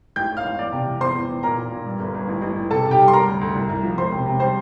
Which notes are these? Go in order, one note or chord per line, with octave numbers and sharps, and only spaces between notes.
A1 G5 G6
A2
F5 F6
A1
E2 D5 D6
C3
E2
E2 C5 C6
E2
E2
A#2 A#4 A#5
A#2
A#2
G2
G1
G1
A1
A1
E3
C3 A4 A5
C3
G4 G5
G3
C6
G3 A#4 A#5
D2
D2
C2
C2
F3
E1 C5 C6
C3
C3
G3 C5 C6